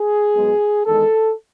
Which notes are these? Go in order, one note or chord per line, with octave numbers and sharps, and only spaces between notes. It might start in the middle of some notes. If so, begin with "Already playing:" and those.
Already playing: G#4
B1 B2 G#3
E2 D#3 G#3 A4